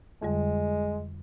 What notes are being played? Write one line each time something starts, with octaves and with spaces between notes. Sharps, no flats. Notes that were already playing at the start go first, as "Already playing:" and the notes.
F2 D3 G3 G#3